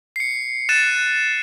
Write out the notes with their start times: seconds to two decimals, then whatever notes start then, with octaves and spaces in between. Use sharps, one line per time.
0.16 C7 C#7
0.69 F#6 A6 C7 D#7 E7